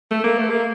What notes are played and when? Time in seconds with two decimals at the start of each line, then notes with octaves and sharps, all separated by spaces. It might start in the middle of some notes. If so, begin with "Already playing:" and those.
0.11 A3
0.24 A#3
0.38 A3
0.50 A#3